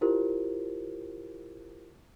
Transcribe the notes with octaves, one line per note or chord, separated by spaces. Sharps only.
E4 F4 G4 A#4 C5